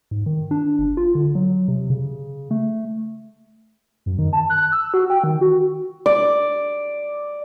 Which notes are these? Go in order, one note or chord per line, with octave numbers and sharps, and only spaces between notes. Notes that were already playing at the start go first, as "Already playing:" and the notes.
G#2
D#3
D4
G1
F4
D3
F#3
C3
C#3
A3
F#2
D#3
A5
F#6
E6
F#4
G5
D#3
F#4
D5